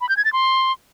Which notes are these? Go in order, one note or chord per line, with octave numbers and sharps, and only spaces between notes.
B5
G6
G#6
A6
C6